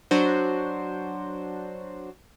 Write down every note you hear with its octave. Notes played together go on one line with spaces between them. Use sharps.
F#3 D4 F#4 C5